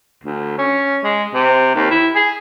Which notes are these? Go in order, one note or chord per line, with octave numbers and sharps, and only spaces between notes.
D2
C#4
G#3
C3
D#2
E4
G#4